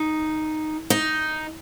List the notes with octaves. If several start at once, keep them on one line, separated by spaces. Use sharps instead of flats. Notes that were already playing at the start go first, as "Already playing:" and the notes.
Already playing: D#4
D#4